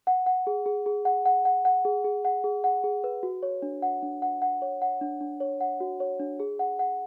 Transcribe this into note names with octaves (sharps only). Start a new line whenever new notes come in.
F#5
F#5
G#4
G#4
G#4
F#5
F#5
F#5
F#5
G#4
G#4
F#5
G#4
F#5
G#4
B4
F#4
C#5
D4
F#5
D4
F#5
F#5
C#5
F#5
D4
D4
C#5
F#5
F#4
C#5
D4
G#4
F#5
F#5